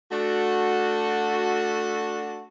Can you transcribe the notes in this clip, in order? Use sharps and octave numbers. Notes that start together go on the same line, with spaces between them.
A3 D4 F#4